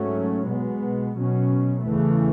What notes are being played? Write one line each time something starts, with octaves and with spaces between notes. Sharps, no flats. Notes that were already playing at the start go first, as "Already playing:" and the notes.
Already playing: G#2 F#3 A3 C#4
B2 G#3 B3
B2 F#3 C#4
E2 C#3 E3 A3